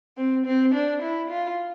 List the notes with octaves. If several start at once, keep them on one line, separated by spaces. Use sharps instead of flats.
C4
C4
D4
E4
F4